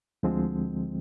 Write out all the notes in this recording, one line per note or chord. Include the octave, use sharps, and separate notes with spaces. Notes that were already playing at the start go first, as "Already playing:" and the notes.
D2 D3 F3 G#3 C4